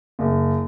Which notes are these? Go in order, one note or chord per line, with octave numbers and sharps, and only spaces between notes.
F#1